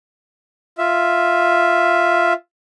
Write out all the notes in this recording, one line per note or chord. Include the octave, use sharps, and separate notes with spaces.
F4 E5